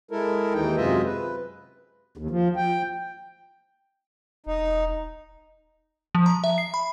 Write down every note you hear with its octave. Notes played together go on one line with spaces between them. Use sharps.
G#3 E4 A4 A#4
D#2 E3 D#4 G5
F#2 C3 G#3 F4 D#5 E5
B4
D#2
F3
G5
E1 D#4
F3
A#5
E5
C7
B5